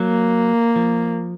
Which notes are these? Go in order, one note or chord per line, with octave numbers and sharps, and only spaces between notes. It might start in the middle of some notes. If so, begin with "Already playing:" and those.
Already playing: F#3 A#3
F3